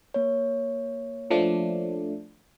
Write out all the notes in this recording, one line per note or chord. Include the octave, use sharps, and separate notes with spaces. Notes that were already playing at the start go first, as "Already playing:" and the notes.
A#3 C#5
F3 A3 D4